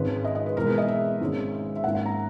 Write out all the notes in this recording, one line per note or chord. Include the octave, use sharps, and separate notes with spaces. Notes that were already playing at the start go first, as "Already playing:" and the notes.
Already playing: G#1 G#2 D#3 G#3 C#4 B4
D#5
D#5
B4
E2 B2 G#3 A#4
B4
D#5
E5
G#1 G#2 D#3 G#3 C#4
E5
G#2 D#3 A#3 C#4 F#5
F#5
A#5